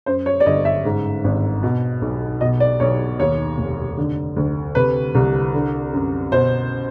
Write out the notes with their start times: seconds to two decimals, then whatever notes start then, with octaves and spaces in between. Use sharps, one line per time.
0.06 F#2 C5
0.26 C#5
0.40 D5
0.46 G1 D#5
0.65 E5
0.85 G#2
1.24 G#1
1.63 B2
2.02 B1
2.41 B2 D#5
2.60 D5
2.80 B1 C#5
3.19 D#2 C#5
3.58 F1
3.98 D3
4.36 D2
4.75 C3 B4
5.15 C2
5.54 D3
5.93 F#2
6.32 B2 C5